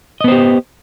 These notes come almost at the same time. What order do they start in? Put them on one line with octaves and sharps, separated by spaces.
D#5 B3 C5 G4